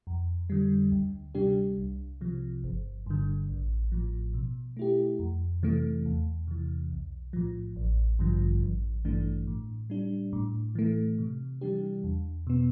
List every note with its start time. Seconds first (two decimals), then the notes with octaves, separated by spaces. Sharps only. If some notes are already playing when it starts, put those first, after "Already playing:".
0.07 F2
0.50 D3 G3
0.92 D2
1.35 C3 G3 D4 G4
1.78 C2
2.21 C3 F3
2.64 G1
3.06 G2 D3
3.49 A1
3.92 A2 F3
4.34 B2
4.77 A3 E4 G4
5.19 F2
5.63 C3 E3 A3
6.06 E2
6.47 C3 E3
6.91 B1
7.33 A2 F3
7.76 A1
8.19 G2 D3 F3
8.62 A1
9.05 G2 E3 A3 D4
9.47 A2
9.90 G3 D4
10.33 A2
10.75 E3 A3
11.18 C3
11.61 E3 G3 D4 G4
12.04 E2
12.47 B2 B3